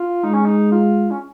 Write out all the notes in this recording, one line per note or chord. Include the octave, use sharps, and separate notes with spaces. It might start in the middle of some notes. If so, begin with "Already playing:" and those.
Already playing: F4
G#3 D#4
C#4
D#4
F4
C#4